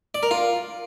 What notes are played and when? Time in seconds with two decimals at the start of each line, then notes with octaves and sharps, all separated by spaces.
0.15 D5
0.23 A#4
0.31 F4